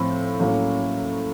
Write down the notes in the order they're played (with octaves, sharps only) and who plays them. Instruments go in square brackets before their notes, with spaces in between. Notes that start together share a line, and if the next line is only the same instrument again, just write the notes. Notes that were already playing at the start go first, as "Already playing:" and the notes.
Already playing: [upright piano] A2 F3 C4
A2 F#3 A#3 C#4